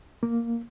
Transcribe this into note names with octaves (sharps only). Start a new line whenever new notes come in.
A#3